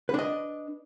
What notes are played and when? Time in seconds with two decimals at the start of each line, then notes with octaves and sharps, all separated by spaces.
0.09 B4
0.14 D4
0.19 D#5